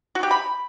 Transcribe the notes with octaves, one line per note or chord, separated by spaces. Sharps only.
F#4
G4
B5